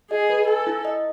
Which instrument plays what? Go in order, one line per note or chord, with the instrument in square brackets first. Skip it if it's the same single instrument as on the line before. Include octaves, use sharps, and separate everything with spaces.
[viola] G#4 [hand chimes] D#5
[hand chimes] B4
[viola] A4 [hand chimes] G#5
[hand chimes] E4
D#5